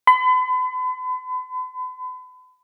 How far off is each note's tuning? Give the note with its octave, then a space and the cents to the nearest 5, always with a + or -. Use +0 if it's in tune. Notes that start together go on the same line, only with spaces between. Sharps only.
B5 +40